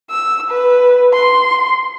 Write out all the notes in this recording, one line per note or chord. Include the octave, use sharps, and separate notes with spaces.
E6
B4
C6